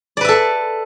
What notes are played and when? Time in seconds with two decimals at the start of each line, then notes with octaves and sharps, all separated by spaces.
0.17 D5
0.21 B4
0.25 E5
0.28 A4